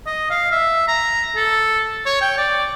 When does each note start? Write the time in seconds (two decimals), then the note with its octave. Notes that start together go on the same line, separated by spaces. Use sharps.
0.06 D#5
0.30 F5
0.52 E5
0.88 A#5
1.36 A4
2.06 C#5
2.21 G5
2.38 D5